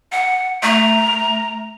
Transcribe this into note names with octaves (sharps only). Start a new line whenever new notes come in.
F#5
A3 A#5